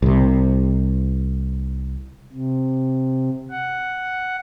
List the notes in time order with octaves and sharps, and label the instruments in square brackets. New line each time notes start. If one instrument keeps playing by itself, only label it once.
[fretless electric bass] C2 C3
[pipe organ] C3
F#5